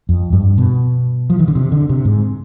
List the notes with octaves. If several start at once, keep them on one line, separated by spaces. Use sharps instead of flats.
F2
G2
B2
F3
D#3
D3
C3
D3
C3
G#2